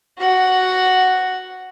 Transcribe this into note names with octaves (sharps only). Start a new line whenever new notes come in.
F#4 F#5